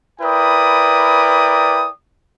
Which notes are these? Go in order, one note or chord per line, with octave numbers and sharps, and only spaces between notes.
E4 A#4 B4 D5 G5 D#6